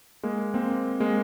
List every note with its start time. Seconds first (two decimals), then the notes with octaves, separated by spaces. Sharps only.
0.23 G#3 A#3
0.54 A#3 C4
1.00 G#3 A#3